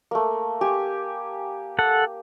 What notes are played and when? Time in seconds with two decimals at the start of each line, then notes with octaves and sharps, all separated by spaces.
0.11 A3 A#3
0.61 G4 G#5
1.79 A4 F#5